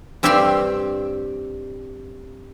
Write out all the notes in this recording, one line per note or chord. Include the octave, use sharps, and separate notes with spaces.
G2 C4 G4 E5 G5 C6